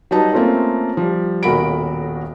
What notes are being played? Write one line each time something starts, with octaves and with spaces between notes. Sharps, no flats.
F#3 G3 D#4 B4 A5
A3 A#3 C4 C#4 F4 A4
F3 G3
D#1 B1 F#4 A#4 B5 D7